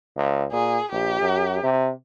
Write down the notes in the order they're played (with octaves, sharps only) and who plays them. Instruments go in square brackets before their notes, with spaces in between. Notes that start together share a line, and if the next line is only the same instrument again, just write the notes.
[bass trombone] C#2
[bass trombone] A#2 [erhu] G#4
[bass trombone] A#1 [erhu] G4
[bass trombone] F#2
C3